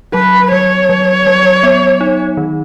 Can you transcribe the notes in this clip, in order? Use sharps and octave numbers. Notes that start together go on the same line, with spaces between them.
F#3 B4
F#3 C#5
F#3
F#3
B3
D#4
D#3